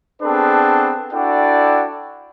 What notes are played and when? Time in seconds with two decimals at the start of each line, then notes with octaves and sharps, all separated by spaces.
0.23 B3 C4 D4 G#4 A4 B4
1.13 D4 E4 F#4 A4 D5 G5